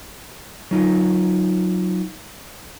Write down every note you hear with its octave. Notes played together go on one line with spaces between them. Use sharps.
F#3 D#4 F4